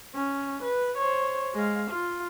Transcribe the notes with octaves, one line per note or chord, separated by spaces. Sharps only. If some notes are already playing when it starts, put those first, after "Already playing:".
C#4
B4
C5 C#5
G#3 F5
F4